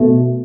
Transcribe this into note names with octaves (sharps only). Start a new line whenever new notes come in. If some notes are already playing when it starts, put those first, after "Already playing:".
Already playing: B2 A3